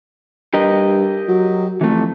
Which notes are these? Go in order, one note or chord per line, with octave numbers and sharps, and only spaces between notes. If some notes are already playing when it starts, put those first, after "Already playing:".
G2 G4 A#4 D#5
F#3
F2 E3 A3